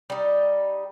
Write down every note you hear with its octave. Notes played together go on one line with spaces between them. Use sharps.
G3 D#4